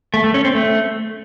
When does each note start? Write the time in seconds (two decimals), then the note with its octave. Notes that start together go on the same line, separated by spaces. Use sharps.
0.14 A3
0.24 A3
0.34 C#4
0.45 C4
0.55 A3